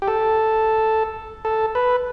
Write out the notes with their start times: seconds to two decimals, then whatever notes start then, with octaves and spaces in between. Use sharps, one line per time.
0.02 G4
0.08 A4
1.45 A4
1.75 B4